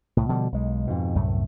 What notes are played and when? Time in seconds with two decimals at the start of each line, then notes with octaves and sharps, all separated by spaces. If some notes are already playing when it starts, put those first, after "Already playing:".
0.17 C2 A2
0.29 B2 D3 F3 G3
0.52 B1 G#3
0.87 F2 G#2 B2
1.15 C2 F#2 A2 A3